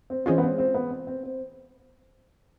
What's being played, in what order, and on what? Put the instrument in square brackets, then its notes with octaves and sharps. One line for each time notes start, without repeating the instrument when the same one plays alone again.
[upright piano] C4
[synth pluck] E3 G#3 C#4 F4 [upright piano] C4
[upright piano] B3
C4
C4
B3
C4
C4
C4